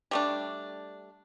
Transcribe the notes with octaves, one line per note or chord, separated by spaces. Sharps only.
G3 A3 D4